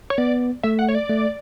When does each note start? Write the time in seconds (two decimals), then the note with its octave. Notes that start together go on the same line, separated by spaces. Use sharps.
0.10 C#5
0.18 B3 D5
0.63 A3 E5
0.79 F#5
0.89 C#5
0.95 D5
1.09 A3